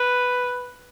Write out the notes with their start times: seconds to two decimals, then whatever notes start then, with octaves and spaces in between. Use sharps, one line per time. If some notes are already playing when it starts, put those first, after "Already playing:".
Already playing: B4